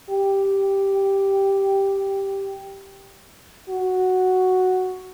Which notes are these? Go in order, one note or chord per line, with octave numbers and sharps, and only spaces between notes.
G4
F#4